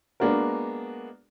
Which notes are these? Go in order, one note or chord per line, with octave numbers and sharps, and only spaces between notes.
G#3 A#3 B3 D4 F#4 A#4